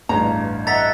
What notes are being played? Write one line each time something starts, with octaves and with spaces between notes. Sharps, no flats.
A1 E2 G2 A#5
D#5 E5 F#5 A#5 A6 B6